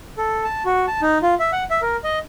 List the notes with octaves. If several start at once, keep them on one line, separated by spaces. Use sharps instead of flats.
A4
A5
F#4
A5
D#4
F4
E5
F#5
E5
A#4
D#5